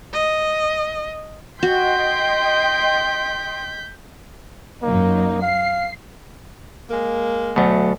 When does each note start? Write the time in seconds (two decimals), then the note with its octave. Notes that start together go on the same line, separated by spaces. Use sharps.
0.13 D#5
1.63 F#4 D#5 G5 C6 G6 B6
4.82 F#2 F#3 A#3 D#4
5.42 F5 C7
6.90 G#3 A#3
7.56 D2 B2 F#3 A3